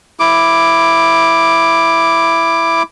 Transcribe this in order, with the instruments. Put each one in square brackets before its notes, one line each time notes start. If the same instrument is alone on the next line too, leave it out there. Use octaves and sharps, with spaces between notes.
[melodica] E4 D6